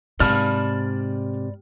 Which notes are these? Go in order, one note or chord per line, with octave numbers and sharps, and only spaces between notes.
G#2 C3 D5 A5 B5 F6